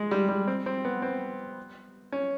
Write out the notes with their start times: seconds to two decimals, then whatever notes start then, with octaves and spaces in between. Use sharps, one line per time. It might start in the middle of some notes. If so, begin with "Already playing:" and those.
Already playing: G#3
0.11 G3
0.29 G3
0.47 C4
0.66 C4
0.85 B3
1.02 C4
2.12 C#4